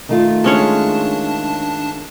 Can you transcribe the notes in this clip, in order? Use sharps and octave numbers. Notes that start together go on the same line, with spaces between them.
D#3 A3 F4
G#3 C#4 D4 C#5 A5